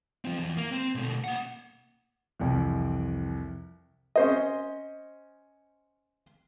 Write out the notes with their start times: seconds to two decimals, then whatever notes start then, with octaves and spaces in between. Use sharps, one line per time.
0.25 F3 C4
0.38 E2 E3
0.57 A#3
0.72 C4
0.95 B2 A3
1.24 A#3 F#5
2.40 C2 F2 E3
4.16 C#4 C5 D#5